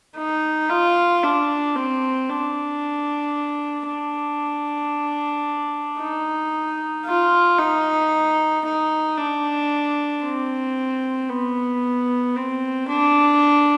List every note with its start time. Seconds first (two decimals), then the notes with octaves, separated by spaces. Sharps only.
0.17 D#4
0.69 F4
1.24 D4
1.75 C4
2.29 D4
3.87 D4
6.00 D#4
7.05 F4
7.59 D#4
8.65 D#4
9.17 D4
10.23 C4
11.29 B3
12.36 C4
12.88 D4